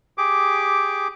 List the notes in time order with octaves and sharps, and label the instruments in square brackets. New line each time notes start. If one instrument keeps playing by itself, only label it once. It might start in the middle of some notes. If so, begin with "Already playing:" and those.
[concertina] G4 G#4 D6